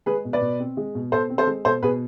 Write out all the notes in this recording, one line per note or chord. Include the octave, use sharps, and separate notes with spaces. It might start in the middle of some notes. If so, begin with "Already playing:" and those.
G#3 G#4 B4
B2
B4 D5
B2
C4
G#3
B2
B2 A4 C5
C4
A4 C5
G#3
B2 A4 C5
B2 G#4 B4